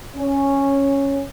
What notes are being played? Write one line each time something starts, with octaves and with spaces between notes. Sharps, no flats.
C#4